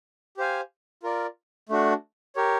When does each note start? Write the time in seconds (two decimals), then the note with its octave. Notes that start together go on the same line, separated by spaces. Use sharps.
0.37 G4 C5 F5 G#5
1.03 F4 A#4 D5
1.69 A3 D4 F#4
2.36 G4 A#4 C#5